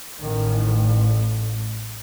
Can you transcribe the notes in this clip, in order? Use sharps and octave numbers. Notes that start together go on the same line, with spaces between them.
A1 A2 D#3